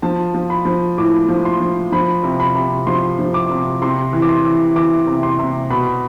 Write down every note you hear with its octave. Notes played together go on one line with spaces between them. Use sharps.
F3 A5
F3
B5
F3
A2 D6
F3
C6
F3
F3 B5
C3
B5
C3
F3 C6
F3
D6
C3
C3 C6
E3
D6
C6
E3
E3 D6
C3
C6
C3
B2 B5